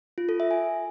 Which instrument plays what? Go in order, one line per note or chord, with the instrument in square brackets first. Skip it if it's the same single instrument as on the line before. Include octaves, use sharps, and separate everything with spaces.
[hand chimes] F4
A4
E5
G#5